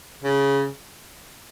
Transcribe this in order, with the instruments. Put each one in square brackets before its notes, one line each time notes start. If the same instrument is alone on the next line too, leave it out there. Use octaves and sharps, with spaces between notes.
[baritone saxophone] C#3